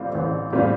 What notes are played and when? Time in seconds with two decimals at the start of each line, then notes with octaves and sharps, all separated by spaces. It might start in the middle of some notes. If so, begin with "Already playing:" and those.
Already playing: A1 A2 G3 C4 F4
0.15 A1
0.52 A2 G3 C4 F4